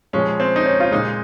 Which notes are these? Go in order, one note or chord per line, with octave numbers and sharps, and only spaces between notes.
A#2 F3 G#3 C#4
C4
D#4
C#4
F4
A#2 G#3 D#4